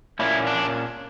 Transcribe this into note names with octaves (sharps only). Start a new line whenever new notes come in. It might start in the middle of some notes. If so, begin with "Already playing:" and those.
A#2 A#3 C#4 E4
D4